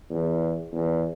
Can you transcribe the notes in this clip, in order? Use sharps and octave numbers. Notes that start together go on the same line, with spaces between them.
E2
E2